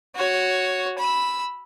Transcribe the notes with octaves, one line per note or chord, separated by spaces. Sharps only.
F#4 C#5
B5 E6